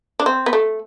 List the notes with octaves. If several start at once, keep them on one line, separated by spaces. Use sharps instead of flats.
D4
C4
B3
A3